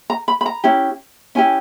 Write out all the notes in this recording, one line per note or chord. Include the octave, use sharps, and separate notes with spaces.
A#5
B5
B5
A#5
C#4 E4 G4
C#4 E4 G4 G#5